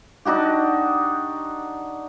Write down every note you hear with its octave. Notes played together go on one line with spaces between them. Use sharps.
D4 D#4 F#4 G4